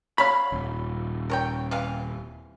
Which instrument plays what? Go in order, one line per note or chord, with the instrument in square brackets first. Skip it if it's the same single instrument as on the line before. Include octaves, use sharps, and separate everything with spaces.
[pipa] F#3 C#5 F5 [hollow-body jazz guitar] B5
[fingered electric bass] D#1
[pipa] A#4 C#5 G5
C3 E3 F5